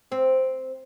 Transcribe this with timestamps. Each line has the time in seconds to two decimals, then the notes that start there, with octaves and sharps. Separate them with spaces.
0.12 C4